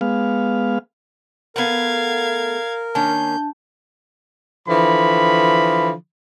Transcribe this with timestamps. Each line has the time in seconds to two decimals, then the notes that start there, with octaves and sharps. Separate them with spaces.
0.01 G#3 B3 F5
1.56 A3 B3 A#4 F5 F#5 G#6
2.95 D#3 A#3 C#4 D4 A5 G6
4.68 D3 E3 F3 B5